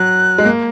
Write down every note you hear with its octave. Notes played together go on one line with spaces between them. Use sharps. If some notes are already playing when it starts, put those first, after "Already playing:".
Already playing: F#3 F#6
G#3
A#3